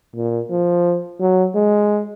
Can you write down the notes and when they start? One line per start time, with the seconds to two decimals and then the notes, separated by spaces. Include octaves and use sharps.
0.16 A#2
0.50 F3
1.20 F#3
1.55 G#3